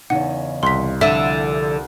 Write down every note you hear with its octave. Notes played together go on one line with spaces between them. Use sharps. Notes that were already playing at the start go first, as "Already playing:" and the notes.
E2 C#3 D#4 F#5
C2 C6 B6
D3 F3 E4 E5